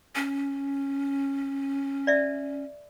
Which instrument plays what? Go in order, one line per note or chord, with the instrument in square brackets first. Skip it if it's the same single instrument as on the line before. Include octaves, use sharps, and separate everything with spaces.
[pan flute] C#4
[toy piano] D5 E5